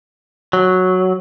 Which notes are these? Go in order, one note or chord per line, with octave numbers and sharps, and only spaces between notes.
F#3